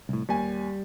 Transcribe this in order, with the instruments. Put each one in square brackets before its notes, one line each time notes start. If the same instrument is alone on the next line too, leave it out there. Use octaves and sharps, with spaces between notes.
[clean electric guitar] C2 A2
[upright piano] D#2 G#5 [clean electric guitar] G3